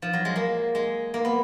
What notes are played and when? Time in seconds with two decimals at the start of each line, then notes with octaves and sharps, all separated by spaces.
0.02 F3
0.13 F#3
0.25 G#3
0.36 A#3
0.75 G#3
1.14 A#3
1.25 B3